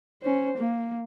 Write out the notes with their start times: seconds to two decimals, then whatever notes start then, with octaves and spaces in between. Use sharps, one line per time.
0.22 C#4 C5
0.57 A#3